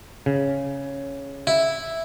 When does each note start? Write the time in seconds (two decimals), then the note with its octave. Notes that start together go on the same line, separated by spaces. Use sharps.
0.26 C#3
1.47 E4